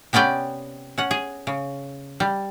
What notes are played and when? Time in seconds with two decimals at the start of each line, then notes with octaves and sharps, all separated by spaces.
0.13 C3 B3 C#4 D5 G5
0.98 C#4 F#5
1.11 G#4
1.47 C#3
2.20 G3